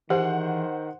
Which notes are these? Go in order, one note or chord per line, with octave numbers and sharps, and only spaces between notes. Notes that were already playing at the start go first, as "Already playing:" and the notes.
D#3 E3 G4 G#4 C5 F#5